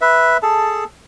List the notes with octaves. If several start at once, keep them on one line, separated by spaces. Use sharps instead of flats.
B4 E5
G#4 A4 A5